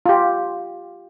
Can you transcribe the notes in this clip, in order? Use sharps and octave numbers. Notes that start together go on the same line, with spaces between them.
F4 G4